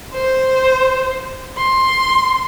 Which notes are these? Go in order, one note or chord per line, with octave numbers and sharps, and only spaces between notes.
C5
C6